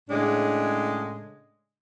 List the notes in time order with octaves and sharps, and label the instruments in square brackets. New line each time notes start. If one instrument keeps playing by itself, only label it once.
[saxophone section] A2 C#3 G#3 D4